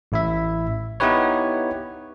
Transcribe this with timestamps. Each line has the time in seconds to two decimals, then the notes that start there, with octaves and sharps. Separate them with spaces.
0.12 A1 E4 E5
1.00 B3 D#4 E4 G4 B4 C#5